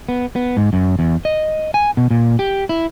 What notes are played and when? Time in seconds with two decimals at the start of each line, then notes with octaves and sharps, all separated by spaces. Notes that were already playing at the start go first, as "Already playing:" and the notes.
0.09 B3
0.36 B3
0.57 G#2
0.73 F#2
0.99 E2
1.25 D#5
1.74 G#5
1.97 B2
2.11 A#2
2.39 G4
2.69 E4